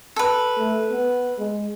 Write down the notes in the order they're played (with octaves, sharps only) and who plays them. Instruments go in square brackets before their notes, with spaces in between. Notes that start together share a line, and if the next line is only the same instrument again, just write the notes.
[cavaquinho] A4 B4
[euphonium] A3
B3
G#3